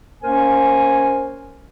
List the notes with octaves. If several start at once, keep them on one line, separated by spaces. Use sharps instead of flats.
A#3 C#4 A#4 C5 G#5